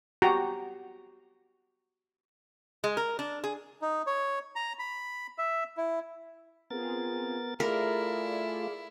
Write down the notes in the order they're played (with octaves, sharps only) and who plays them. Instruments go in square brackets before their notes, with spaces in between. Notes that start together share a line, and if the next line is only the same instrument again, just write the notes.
[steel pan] F#4 G4 A#5
[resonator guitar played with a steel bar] G#3
A#4
D4
G#4
[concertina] D#4
C#5
A#5
B5
E5
E4
[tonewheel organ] B3 A#4 A6 [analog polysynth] C4 F4 G#4
[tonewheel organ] A3 F4 [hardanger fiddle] E4 [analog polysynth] G#4 D5 F5 [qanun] A#4